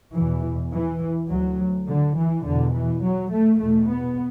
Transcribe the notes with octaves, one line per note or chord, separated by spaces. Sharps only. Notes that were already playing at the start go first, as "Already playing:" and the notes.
E2 B2 E3
E3
D2 F#3
D3
E3
E2 B2 D3
E3
F#3
A3
E2 B2 A3
B3